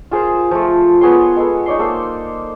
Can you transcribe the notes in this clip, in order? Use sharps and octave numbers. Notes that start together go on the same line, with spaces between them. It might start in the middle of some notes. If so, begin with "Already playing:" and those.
F4 G#4 A#4 C5
F3 A3
B3 G#4 C#5 C6
G#3 B3 A4
D#4 C#5 D5 C6
A#3 A4 C5 C6